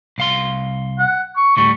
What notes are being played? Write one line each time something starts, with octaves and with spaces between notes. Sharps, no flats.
C2 F5 C6
F#5
C#6
D2 A2 G3 C#6